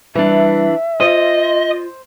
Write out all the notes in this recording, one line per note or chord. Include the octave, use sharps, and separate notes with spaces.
E3 G3 D4 E5
F4 C5 D#5